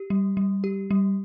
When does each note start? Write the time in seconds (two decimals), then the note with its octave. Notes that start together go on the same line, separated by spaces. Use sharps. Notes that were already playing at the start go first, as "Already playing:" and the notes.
Already playing: G4
0.10 G3
0.37 G3
0.64 G4
0.91 G3